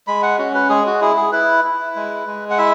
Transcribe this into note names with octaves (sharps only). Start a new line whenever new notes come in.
G#3 B5
F#5
C#4 F#4
B4
G#3 G#4
F#4
E4 G#4
G#4
E4 B4
E4
G#3
G#3
F#5
E4 E5